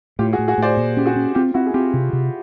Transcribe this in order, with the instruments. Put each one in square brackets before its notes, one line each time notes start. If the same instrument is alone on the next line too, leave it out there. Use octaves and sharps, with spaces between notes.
[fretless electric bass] A2 [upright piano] F4 G4
[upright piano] F#4 G#4
[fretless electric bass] A2
[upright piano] F#4 G#4
[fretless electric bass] A2 [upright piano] C5 D5
[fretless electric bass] A#2
[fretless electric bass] C#4 [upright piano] G4
[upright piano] F#4 G#4
[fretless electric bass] C#4
[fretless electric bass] C4 [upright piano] F4 G4
[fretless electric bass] C4 [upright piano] E4 F#4
[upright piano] G#4
[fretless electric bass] C4 [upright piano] F4 G4
[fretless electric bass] C3
C3